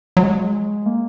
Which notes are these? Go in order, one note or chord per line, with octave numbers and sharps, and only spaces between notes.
F#3
G#3
A#3